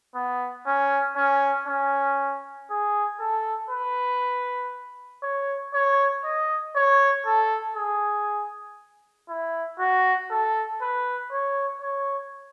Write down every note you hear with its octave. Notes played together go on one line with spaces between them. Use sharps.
B3
C#4
C#4
C#4
G#4
A4
B4
C#5
C#5
D#5
C#5
A4
G#4
E4
F#4
A4
B4
C#5
C#5